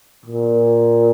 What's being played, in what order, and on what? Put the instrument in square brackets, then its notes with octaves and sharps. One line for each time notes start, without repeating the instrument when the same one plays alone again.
[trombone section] A#2